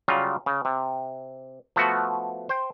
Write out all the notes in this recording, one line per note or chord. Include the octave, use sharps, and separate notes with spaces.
C#3 F#3 G3 F4
C#3
C3
F3 A3 B3 F#4
C5 G5